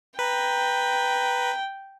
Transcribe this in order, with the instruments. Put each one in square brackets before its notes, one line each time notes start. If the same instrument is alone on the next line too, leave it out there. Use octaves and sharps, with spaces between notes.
[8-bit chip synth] B4 [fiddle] G5 [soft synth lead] A#5